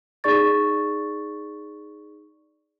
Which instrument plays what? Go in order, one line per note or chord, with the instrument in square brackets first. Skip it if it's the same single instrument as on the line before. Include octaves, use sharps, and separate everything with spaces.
[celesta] D#4 G#4 D5 C#6 A6